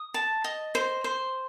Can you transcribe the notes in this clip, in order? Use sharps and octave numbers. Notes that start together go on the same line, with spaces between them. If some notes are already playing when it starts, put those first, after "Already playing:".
Already playing: D#6
A5
D#5
C5
C5